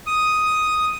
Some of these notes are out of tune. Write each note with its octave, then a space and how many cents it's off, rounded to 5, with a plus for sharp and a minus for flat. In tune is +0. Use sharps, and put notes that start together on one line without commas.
D#6 +5